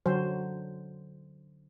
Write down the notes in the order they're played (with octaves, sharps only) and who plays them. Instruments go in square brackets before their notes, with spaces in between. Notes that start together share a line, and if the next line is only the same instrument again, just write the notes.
[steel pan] D3 F#3 C5